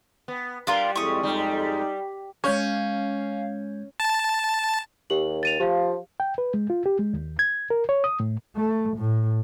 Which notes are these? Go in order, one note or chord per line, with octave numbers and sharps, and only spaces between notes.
B3
G3 D4 F4 A#4
F2 G#3 E4 C#6 D#6
G3 D#4
G#3 C#4 C#5 F5 G6 G#6
A5
D#2 G4 F#7
A6 D#7 F7
F3 G4 F5
G5
B4
G#3
F4
G4
G#3
D#2
G#6
A#4
C#5
D#6
A2
A3
A2